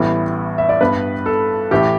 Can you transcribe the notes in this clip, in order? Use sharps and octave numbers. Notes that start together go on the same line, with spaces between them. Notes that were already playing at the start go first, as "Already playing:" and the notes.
Already playing: A1 A2 E3 G3 B3
E5
D5
G2 G3 B3 B4
A4
A1 A2 E3 A3 G4